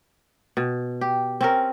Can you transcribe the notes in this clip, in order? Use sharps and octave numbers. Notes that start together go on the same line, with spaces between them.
B2
G4
C4 C#4 A#4